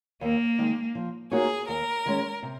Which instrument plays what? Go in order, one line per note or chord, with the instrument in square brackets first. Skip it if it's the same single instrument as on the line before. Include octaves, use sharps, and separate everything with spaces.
[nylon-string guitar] D#2 [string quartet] A#3
[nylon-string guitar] D#3 G#3 D#4
F3
[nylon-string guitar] A#3 D#4 F#4 C#5 [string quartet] G#4
[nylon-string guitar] D#2 [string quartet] A#4
[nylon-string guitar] D#3 G#3 C#4
C3